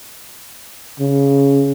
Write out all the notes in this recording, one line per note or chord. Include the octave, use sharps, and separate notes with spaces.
C#3